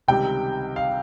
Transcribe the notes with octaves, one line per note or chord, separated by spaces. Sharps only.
C#2 C3 D#3 G3 G5
F5